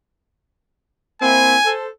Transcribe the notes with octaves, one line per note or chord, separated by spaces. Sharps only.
A#3 C4 E4 G#5
A4 C5